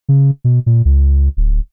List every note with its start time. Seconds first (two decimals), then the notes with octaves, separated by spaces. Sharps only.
0.09 C#3
0.44 B2
0.66 A#2
0.85 C#2
1.37 D1